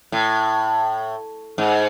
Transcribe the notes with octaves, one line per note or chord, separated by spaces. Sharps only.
A2
G#2